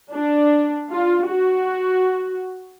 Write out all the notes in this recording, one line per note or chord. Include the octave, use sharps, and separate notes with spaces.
D4
F4
F#4